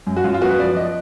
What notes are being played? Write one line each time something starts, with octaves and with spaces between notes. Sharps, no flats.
F#2
F#4
F#2 F4
F4
B3 F#4
B4
F3 D5
D#5